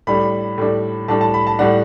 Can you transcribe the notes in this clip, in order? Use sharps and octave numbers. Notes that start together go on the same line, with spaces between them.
A2 G3 D4 B5
A2 G3 D4
A2 G3 D4 A5
A5
B5
A5
A2 G3 D4 F#5